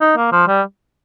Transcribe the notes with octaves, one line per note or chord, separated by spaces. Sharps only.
D#4
A#3
F3
G3